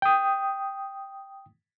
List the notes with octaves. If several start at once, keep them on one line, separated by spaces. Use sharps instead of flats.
G5 D#6